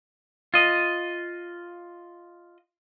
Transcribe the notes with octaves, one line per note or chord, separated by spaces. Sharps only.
F4 D#5